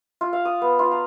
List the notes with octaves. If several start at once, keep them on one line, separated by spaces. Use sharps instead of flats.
F4
F5
D#6
B3
F4
A#5